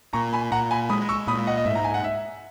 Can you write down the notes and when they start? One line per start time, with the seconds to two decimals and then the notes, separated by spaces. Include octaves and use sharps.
0.13 A#2 A#5 C#6
0.33 G#5 B5
0.52 A#2 F#5 A#5
0.71 G#5 B5
0.89 G#3 B5 D#6
1.09 C#6 E6
1.27 A#2 B5 D#6
1.47 D#5 F#5
1.57 D#5
1.65 G#2 E5
1.75 A#5
1.84 G#5
1.94 F#5
2.04 E5